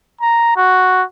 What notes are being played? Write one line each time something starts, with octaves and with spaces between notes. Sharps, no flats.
A#5
F#4